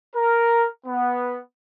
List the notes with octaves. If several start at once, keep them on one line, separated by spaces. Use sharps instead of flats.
A#4
B3